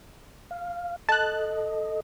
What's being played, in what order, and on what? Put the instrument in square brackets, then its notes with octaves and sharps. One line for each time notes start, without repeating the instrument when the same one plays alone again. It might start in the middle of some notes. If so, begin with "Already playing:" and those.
[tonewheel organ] F5
[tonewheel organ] A4 D#5 [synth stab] A5 F#6